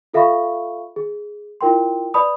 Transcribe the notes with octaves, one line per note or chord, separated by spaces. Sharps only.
F4 A4 E5 F5 B5 C#6
G#4
E4 F4 A#4 G5 C6
B4 D5 A5 B5 D#6